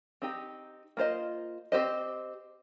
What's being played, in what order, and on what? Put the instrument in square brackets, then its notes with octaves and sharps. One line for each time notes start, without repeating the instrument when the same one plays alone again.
[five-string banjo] C4 D#4 G4
A#3 F4 C5 D#5
C4 G4 C5 D#5